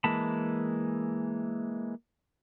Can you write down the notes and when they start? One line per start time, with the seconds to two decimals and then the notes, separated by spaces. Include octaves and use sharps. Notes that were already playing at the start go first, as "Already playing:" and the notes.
0.04 E3 G#3 A#3 A5 B5